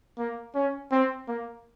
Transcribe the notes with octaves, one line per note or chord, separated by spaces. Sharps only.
A#3
C#4
C4
A#3